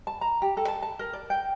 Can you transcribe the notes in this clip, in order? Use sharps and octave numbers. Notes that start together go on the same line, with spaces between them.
A5
A#5
G4
A4
A5
A5
A#4
D5
G5